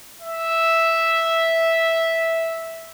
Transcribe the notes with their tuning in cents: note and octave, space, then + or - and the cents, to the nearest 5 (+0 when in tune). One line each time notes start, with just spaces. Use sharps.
E5 -5